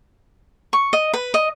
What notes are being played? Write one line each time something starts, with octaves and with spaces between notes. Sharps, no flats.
C#6
D#5
B4
D#5